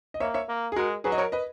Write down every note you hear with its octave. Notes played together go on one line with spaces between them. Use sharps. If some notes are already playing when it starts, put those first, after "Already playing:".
D#5
A#3 C#5 E5
C#5 E5
A#3
G#4
G#3 F#4 A#4
F#3 G#4 B4
D#5
A#4 C#5
B4 D#5